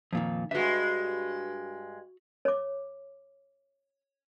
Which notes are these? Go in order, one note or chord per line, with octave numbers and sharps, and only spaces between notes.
F2 A#2 D#3
G2 G#3 F#4 E5
C#5 D6